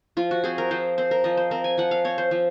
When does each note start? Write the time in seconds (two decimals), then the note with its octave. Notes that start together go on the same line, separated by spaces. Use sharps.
0.17 F3 F4
0.31 F#4
0.44 C4 G#4
0.58 A#4
0.71 F3 C5
0.98 C4 C5
1.11 A#4
1.24 F3 D#5
1.37 C5
1.51 C4 A#4
1.64 G#5
1.78 F3 F#5
1.91 F5
2.04 C4 C#5
2.18 C5
2.31 F3